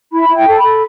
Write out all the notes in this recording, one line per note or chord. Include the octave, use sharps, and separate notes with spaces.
E4 B5
E4
G5
A4 A5
A4 B5